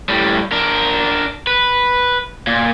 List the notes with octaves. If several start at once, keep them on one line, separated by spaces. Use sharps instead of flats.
A2 G3
D4 A#4
B4
A#2